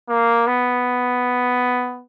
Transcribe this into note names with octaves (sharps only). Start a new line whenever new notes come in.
A#3
B3